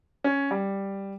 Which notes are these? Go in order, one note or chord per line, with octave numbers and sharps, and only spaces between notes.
C#4
G3